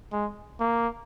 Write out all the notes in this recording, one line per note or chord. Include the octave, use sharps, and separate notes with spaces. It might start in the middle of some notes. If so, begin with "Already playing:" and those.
G#3
A#3